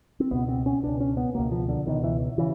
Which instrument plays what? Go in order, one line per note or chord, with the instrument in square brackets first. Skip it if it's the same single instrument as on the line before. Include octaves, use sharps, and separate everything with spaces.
[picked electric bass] C4
C#2 B2 B3
C4
C#4
C#2 B2 D4
C#4
B3
C#2 B2 A#3
F3
D3
C#2 B2 D#3
E3
C#3 E3